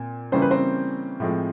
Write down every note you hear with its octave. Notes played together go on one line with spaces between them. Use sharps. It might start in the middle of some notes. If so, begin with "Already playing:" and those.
Already playing: A#2 C4
C#3 E3 G3 A#3 C#4 C5
B4
C4 C5
A2 F3 G#3 C4